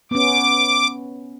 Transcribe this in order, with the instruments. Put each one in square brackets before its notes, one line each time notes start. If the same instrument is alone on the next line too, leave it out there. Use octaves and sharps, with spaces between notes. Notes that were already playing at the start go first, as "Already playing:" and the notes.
[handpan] B3 C#4 [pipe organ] D6